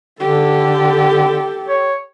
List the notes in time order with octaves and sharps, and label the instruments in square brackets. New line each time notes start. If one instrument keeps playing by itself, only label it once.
[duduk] D3 [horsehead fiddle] G4 A4
[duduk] C#5